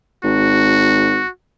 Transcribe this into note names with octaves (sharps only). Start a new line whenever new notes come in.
G#1 F#4